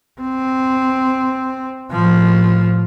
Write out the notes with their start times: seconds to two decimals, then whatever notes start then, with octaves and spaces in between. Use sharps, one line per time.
0.21 C4
1.92 A2 F3